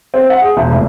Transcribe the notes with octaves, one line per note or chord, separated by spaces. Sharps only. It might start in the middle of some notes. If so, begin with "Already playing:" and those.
C4
F#5
G#4
E1
F1